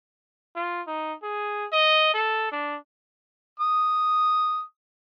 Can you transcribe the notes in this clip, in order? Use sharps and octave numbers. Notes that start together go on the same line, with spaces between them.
F4
D#4
G#4
D#5
A4
D4
D#6